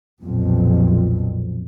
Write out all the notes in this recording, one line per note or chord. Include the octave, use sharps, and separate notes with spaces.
B1 F2 A#2